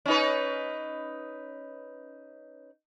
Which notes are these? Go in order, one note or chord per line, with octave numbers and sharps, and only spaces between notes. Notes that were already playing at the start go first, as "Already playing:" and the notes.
C#4 D#4 B4